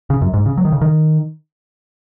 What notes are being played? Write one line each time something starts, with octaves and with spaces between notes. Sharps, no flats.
C#3
F#2
G#2
C#3
F#3
D#3
C#3
D#3